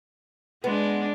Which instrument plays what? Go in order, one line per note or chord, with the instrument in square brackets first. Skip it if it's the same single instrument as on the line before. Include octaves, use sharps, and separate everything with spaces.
[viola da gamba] G#3 D4 [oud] B3